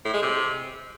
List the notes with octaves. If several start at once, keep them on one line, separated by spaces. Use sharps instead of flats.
A2
G#3
C3